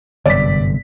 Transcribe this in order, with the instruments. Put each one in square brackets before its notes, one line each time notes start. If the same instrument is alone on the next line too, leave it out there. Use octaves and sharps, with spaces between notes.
[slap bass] G1 F#2 C3 [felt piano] D5 B6